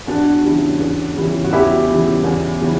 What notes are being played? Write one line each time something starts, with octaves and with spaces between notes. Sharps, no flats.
E2 D4 F#4
C#3 E3 G3
E2
C#3 E3 G3
F#4
E2 E4 G4
C#3 E3 G3
E2
C#3 E3 G3